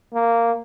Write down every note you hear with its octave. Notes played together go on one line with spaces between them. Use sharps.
A#3